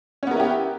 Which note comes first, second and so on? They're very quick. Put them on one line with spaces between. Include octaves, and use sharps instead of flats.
C#4 B3 A#4 E4 G4